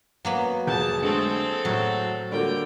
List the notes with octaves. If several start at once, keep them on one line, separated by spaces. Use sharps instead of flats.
F#3 A#3 B3
F1 G#4 A5 F#6 G6
D3 G#3 A3 C4 A4
A2 F#3
D3 G3 A#3 F#4 G5